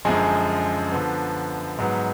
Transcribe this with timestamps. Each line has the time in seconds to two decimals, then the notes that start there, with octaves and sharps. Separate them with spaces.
0.05 F#2 D3 F3 G#3 G#4
0.92 D3 F3 B3
1.78 G#2 F#3 B3